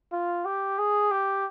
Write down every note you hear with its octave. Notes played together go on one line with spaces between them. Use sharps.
F4
G4
G#4
G4